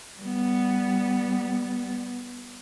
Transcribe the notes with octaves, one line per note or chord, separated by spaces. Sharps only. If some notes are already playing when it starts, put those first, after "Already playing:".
G3 B3